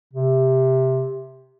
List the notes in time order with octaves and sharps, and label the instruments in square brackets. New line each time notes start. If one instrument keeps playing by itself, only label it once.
[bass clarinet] C3